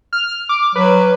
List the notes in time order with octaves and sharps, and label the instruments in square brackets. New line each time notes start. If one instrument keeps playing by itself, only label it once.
[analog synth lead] F6
D6
[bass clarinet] F#3 [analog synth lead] B4